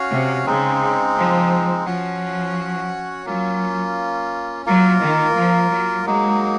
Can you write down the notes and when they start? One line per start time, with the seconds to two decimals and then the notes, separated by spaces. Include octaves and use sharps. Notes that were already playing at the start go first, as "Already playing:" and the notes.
Already playing: C#4 F#4 C#5 F5
0.11 C3
0.46 C#3 G#3 C4 D#4
1.16 F3
1.86 F3 C#4 F#4 C#5 F#5
3.25 F#3 A#3 C#4 F4
4.66 F#3 A#3 F4 A#4
5.00 D#3
5.36 F3
5.71 F#3
6.05 F#3 G#3 A#3 D#4